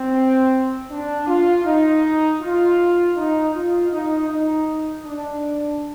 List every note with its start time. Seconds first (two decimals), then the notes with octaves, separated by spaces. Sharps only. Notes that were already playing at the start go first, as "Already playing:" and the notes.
Already playing: C4
0.90 D4
1.27 F4
1.65 D#4
2.41 F4
3.15 D#4
3.54 F4
3.91 D#4
4.29 D#4
5.04 D4